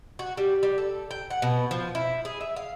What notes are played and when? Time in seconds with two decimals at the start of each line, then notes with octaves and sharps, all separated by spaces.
0.19 F#4
0.37 G3
0.63 G3
0.78 A4
1.11 G5
1.31 F#5
1.42 B2
1.71 F3
1.95 E4
2.25 G#4
2.41 E5
2.56 F5